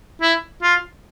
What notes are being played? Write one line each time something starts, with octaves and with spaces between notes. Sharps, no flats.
E4
F4